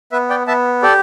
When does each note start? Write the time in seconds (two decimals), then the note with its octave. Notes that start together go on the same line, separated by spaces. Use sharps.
0.12 B3 B4 E5
0.30 D5 G5
0.47 B3 E5 A5
0.82 G4 A4 D5